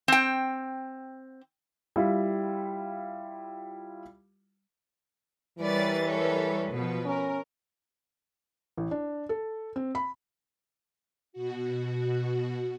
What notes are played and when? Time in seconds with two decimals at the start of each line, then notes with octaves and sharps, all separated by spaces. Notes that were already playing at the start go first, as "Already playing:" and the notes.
0.08 C4 G5
1.96 G3 E4 F4
5.59 E3 G3 A#4 B4 C#5 D5 A6
6.04 A4 C#5
6.73 B2 F3 B4
7.05 C#4 A#4
8.77 A1
8.91 D4
9.29 A4
9.76 C4
9.95 B5
11.33 B2 F#4